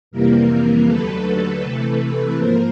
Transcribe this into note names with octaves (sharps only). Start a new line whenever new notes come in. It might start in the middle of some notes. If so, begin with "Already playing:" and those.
F2 C3 E3 G3 A#3 A#4
D#2 D3 F#3 A3 A4 B4
A4 B4
C3 E3 A3 A4 B4
A4 B4
G#2 F3 A#3 A#4 C5